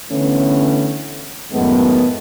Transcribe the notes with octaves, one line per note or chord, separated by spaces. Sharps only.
D3 E3 A3 B3 C#4
F#2 A2 D#3 G#3 A3 B3